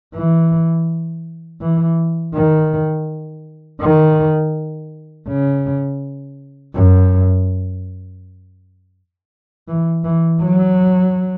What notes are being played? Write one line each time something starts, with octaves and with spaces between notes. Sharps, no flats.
E3
E3
D#3
D#3
C#3
F#2
E3
E3
F#3